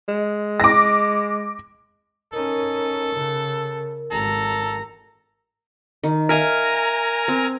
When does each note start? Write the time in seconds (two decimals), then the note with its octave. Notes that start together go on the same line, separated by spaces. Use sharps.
0.08 G#3
0.60 D6 A#6
2.33 C#4 D#4 A4 A#4
3.16 C#3
4.12 G#1 A4 A#5
6.03 D#3
6.29 A#4 E5 F5 G#5 A#5
7.28 C4